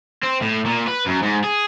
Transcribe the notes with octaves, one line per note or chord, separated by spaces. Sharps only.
C4
A2
A#2
B4
F#2
G#2
G#4